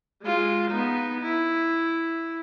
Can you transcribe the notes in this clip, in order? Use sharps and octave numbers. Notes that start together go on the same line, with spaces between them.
G#3 F4
B3 D#4
E4